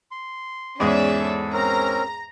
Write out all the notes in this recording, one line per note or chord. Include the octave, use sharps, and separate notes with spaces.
C6
E2 G#2 C#4 G#4 D5 E5
A4
C4 C#4 A#4 A#5